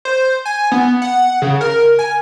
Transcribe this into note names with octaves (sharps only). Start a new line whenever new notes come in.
C5
G#5
B3
F#5
C#3
A#4
G#5